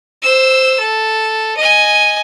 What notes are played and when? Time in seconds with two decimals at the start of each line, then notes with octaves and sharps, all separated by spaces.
0.22 C5 E6
0.79 A4
1.57 D#5 G#5